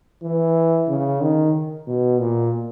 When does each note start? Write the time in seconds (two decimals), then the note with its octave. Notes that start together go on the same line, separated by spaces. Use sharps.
0.23 E3
0.88 C#3
1.21 D#3
1.87 B2
2.20 A#2